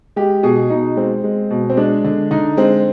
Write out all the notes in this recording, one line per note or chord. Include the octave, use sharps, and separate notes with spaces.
G#3 G4
B2 G#4
B2 D#4
G#3 C4
G#3
B2
C4
G#3 D4
D3
D3 D#4
G#3 C4